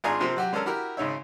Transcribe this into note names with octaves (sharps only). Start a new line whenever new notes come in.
G#1 D4 F4 G#4 G#5 A#5
C3 F3 A#3 C4 A#4
F#3 F#4 G4
G#3 C#4 D4 A4 A#4
E4 F#4 G4 A#4 F#5
G#1 C#3 D#4 C#5 E5